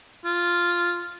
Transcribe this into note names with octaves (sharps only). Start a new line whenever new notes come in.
F4